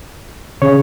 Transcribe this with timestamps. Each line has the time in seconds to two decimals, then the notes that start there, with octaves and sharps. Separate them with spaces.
0.62 C#3 C#5